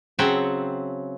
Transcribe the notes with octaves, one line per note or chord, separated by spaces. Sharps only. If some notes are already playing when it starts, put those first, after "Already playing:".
C#3 F#3 C4 E5 F#5 G5